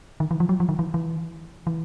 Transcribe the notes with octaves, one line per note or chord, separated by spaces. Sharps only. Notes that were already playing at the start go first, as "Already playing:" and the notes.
D#3
E3
F3
F#3
F3
D#3
E3
E3
E3